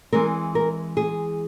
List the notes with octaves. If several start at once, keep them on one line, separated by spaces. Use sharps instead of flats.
E3 G#3 C4 A#4
A#4
G#4